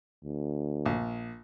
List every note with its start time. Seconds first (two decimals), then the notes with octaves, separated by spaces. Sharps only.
0.25 D2
0.86 A#1